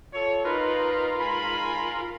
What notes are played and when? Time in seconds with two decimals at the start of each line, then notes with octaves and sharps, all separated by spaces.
0.14 F4 A4 C#5
0.45 D#4 F4 A#4 B4
1.20 G#2 G#5 B5